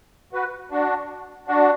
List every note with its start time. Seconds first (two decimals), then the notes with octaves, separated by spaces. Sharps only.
0.33 F#4 B4
0.71 D4 F#4
1.48 D4 F#4